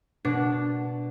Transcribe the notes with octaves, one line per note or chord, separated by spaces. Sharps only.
B2 D4